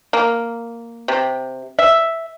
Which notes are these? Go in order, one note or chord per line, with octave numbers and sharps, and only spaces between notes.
A#3
C3
E5